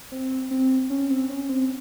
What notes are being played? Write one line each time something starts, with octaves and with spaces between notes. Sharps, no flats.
C4
C4
C#4
C4
C#4
C4